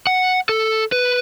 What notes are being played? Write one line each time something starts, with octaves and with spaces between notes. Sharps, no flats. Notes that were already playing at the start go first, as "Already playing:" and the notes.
F#5
A4
B4